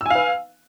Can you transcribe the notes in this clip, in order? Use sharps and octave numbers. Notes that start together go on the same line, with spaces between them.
B4 F5 G#5 E6